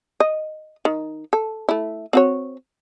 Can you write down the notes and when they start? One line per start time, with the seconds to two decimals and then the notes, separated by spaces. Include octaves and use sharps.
0.20 D#5
0.85 D#3
1.33 A4
1.69 A3 E4
2.13 C4 F#4 C#5